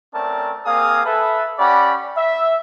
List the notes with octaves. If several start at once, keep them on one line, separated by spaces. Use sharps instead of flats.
A3 C4 C#4 A#4 D5 A5
A#3 C4 G#4 F5 G#5 D#6
A4 B4 E5
C#4 G4 D5 F#5 B5
E5